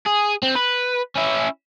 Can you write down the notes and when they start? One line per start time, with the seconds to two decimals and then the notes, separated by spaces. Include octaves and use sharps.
0.06 G#4
0.43 C4
0.55 B4
1.16 C#4 E4